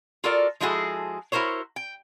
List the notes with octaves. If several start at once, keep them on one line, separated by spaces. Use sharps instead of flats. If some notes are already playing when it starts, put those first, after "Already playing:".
F4 F#4 A4 A#4 D5
F3 G#3 E4 F#4 G#4 A4
E4 F#4 A#4 C5 C#5
G5